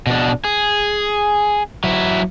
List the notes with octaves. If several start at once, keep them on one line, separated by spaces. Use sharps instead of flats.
B2 D4
G#4
F#3 E4